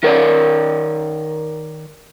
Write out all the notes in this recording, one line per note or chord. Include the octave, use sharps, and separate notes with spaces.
D#3 A#4 C#5 D5